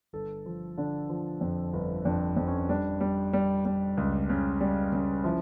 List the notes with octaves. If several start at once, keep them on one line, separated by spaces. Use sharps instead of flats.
G1 A4
F3
D3 D4
F3
F2
G1
F2 D4
F2
C#4
G3 D4
G3
G3
G3
C#2
C#3
G3
C#3
F3 E4